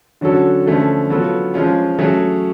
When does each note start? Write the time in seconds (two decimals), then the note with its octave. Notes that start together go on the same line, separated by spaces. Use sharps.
0.21 D3 F#3 C#4 F#4 A4
0.66 D3 F3 A3 C#4
1.10 F#3 B3 F4 A4
1.54 F3 G#3 C#4 F4
1.99 F#3 A3 C#4 G#4